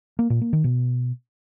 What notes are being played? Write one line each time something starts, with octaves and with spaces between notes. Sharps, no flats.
A#3
A#2
A#3
D#3
B2